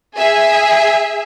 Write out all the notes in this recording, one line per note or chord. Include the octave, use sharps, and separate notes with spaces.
G#4 E5